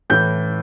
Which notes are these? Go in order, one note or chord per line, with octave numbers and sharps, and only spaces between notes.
A2 E3 G6